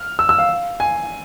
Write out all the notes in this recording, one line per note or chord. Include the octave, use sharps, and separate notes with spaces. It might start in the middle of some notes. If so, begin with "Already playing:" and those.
Already playing: F6
E6
E6
F5
G#5